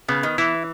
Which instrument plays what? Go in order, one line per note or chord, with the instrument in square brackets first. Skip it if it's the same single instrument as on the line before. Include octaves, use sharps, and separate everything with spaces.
[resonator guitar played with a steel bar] C#3 [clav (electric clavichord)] B3
[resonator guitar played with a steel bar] D#3
[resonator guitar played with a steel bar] E3 [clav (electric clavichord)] E4